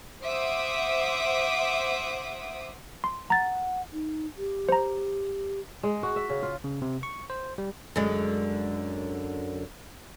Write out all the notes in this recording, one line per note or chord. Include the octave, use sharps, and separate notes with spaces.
C5 E5 F#5 D6 D#6
C6
F#5 A#5 A6
D#4
G4
C5 A#5
G#3
F#4
E5
C#3
F4
C#3
C3
C#6
C5
G3
F#2 D3 G#3